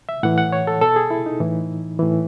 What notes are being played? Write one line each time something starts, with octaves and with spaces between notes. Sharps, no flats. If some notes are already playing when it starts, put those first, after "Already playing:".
E5
A2 E3 F#5
F#5
C#5
A4
B2 A4
G#4
E4
D#4
A2 E3
A2 E3